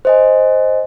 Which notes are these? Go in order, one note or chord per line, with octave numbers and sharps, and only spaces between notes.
C5 D#5 G#5